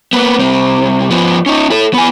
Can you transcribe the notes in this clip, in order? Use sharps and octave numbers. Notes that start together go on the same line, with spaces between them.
A#3 B3
C2 C4
F3 B3
C#4 D#4
E4 A4
B3 G#5